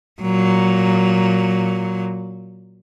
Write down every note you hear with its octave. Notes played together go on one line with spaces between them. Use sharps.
A#2 F#3